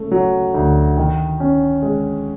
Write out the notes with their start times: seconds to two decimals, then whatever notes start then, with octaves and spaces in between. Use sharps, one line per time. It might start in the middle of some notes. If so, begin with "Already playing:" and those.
Already playing: C#3 A3
0.11 F#3
0.54 D2
0.97 D#3
1.40 C#4
1.82 G#3